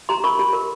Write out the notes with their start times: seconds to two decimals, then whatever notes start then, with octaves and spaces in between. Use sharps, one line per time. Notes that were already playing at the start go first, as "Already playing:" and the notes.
0.09 G4 A#5 C6
0.24 A#4 B5 C#6
0.39 G4
0.53 A#4